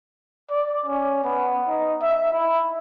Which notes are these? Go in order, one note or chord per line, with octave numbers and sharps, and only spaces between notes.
D5
C#4
B3
D#4
E5
E4